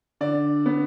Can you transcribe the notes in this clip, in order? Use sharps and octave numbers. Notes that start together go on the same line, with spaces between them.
D3 D5
B3